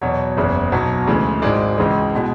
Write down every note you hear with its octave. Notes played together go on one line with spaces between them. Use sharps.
E2 B2 F#3 C#5
F#1 E2 C#3
B1 B2 F#3
D2 C#3 E3 G#3
G#1 G#2 G#3 D5
C#2 C#3 E3 G#3
B2 G#3